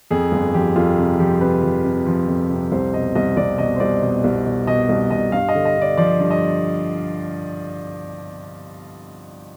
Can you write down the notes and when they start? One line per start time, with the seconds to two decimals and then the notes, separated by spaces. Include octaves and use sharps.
0.11 F2 G#4
0.32 G1
0.54 F3 G4
0.76 F2 F4
0.97 C3
1.19 F3 G4
1.41 C3 B4
1.63 F3
1.84 C3
2.06 F3
2.28 F2
2.50 C3
2.72 C2 C5
2.93 B2 D#5
3.15 C2 D#5
3.37 C2 D5
3.58 B2 D#5
3.76 C5
3.80 C2 D5
4.02 B2
4.24 C2
4.46 B2
4.67 B2 D#5
4.89 C2
5.11 B2 D#5
5.32 G2 F5
5.49 D#5
5.54 D3
5.65 D#5
5.77 D3 D5
5.97 F3 D5
6.20 G2
6.31 D#5